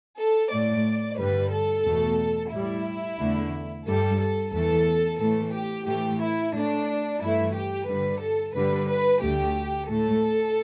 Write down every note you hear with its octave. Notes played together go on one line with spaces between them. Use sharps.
A4
A2 A3 D5
G2 D3 G3 B4
A4
E2 B2 A3
A2 G3 E4
E2 D3 A3
G2 G3 A4
A4
E2 E3 A3 A4
A2 E3 A3 A4
G4
A2 E3 A3 G4
E4
A2 A3 D4
G2 E3 A3 E4
G4
G2 D3 G3 B4
A4
G2 D3 G3 B4
B4
D2 D3 A3 G4
A2 A3 A4